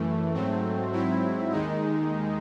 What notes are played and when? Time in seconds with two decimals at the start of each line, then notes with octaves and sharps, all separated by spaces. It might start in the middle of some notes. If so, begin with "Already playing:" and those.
Already playing: F#2 E3 A3
0.34 G#2 F#3 A3 C4
0.92 G#2 F#3 C4 E4
1.51 D#2 D#3 G#3 D#4